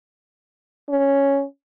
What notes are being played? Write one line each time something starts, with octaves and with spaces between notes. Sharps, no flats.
C#4